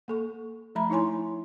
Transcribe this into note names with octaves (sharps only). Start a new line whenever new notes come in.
A#3 A4 C#6
F3 A3 E5 A#5 B5
D#4 E4 C#5 G#5 C6